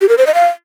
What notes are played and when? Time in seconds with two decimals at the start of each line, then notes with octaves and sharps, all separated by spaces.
0.01 G4
0.09 A#4
0.18 C5
0.27 D#5
0.34 F5